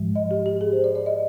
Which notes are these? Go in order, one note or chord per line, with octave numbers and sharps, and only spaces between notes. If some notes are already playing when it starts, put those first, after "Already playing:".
Already playing: G#2 F3 G#3
D#5
G4
G4
G#4
C5
D5
D5
D#5